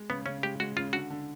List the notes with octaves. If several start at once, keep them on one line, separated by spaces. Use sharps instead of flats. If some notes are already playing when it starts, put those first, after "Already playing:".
Already playing: G#3
C#3 B3
C#3 C#4
G#3 G4
G#3 F#4
C#3 F4
D3 F#4
D3